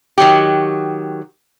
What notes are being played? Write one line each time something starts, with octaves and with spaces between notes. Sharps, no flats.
D#3 F#3 F#4 G4